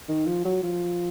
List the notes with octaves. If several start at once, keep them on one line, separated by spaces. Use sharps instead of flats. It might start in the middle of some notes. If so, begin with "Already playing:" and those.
D#3
F3
F#3
F3